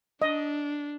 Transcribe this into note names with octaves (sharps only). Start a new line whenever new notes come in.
D4 D#5